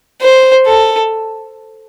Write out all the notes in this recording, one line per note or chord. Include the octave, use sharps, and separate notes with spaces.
C5
A4